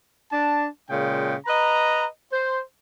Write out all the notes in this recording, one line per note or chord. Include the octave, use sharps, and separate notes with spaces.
D4 A5
A#2 C#3 G#3 G5
B4 D#5 A#5
C5